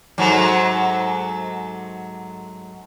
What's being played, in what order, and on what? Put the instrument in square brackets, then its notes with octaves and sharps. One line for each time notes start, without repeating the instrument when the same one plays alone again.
[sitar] G#2 F#3 A3